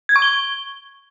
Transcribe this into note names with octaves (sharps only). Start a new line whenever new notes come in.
G#6
C#6
G7